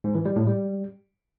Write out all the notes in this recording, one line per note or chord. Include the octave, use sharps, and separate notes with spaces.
G#2
E3
G3
A2
G3